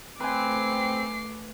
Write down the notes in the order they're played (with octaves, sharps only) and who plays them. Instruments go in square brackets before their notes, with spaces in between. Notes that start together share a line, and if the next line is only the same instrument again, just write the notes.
[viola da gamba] A3 [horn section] C4 [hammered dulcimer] B4 G#5 [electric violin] D6 C7